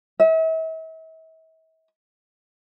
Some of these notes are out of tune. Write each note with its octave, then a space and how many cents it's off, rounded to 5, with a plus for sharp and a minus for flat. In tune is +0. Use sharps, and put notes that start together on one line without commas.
E5 -40